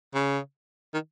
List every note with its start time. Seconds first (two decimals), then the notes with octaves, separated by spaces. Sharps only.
0.15 C#3
0.94 D#3